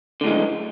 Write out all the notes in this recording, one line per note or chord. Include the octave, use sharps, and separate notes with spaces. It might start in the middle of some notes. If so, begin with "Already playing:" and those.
F#2 A2 D3 G#3